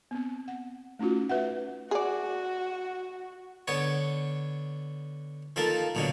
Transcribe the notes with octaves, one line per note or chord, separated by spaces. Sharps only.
B3 C4
F#5
A3 C#4 D#4 F4 F#4
B4 E5 F#5
F#4 G#4 D5
D3 B3 C#5
D#3 F3 A#3 A4 A#4
A#1 B2 D3 D#3 F#3